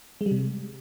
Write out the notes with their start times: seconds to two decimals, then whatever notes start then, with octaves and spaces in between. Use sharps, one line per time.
0.21 G#3
0.26 G3
0.31 C3